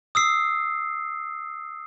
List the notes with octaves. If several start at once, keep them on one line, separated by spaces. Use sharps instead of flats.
D#6 E6 C7